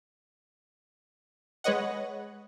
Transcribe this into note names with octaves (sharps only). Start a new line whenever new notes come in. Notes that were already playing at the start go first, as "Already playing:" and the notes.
G#3 B4 C#5 D#5 F#5